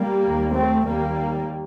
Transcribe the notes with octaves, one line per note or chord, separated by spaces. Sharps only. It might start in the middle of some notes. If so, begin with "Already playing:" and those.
Already playing: G3 A#3
D#2
A3 C4
D#2 G3 A#3